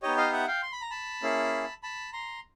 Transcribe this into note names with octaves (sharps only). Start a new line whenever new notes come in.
B3 D#4 G4 C#5 D#5
D#5 F5
E5 F#5
F5 G5
C6
B5
A#5
A5 B5
A#3 C#4 E4 G#4
A5 B5
A#5 C6